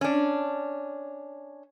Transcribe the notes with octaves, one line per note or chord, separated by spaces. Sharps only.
C#4 D4